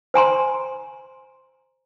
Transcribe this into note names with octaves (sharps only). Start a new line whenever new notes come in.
C5 G#5 A#5 C6